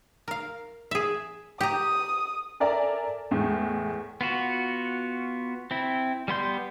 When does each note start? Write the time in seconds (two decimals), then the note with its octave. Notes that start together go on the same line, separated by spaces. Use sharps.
0.28 A#4 F5
0.91 G#4 E5
1.61 G4 A#5 D#6
2.60 A4 A#4 D5 E5 G#5 A#5
3.31 E2 A2 G#3
4.21 B3 F4 F#4
5.71 C4 E4
6.28 G3 B3 C6 G6